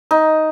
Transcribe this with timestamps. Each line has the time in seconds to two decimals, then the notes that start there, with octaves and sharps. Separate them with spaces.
0.11 D#4